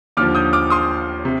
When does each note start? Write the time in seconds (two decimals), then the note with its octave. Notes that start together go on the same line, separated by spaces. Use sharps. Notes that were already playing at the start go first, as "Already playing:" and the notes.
0.17 D#2 D3 F3 D6 F6
0.35 D#6 G6
0.53 D6 F6
0.70 C6 D#6
1.25 C3